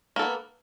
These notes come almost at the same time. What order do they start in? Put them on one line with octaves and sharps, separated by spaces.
A#3 A4 B3